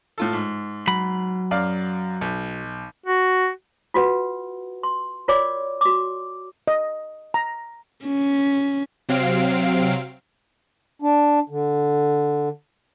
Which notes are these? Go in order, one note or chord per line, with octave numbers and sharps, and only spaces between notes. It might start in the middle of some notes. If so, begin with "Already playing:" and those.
A2 F4 A4
G#2
F#3 B5
F#2 D5 F5
B1
F#4
F4 F#4 B4 F#5
C6
F4 A#4 C#5 D5 D6
F#4 D6
D#5
A#5
C#4
C3 F#3 C4 F5 C7 D7
D4
D3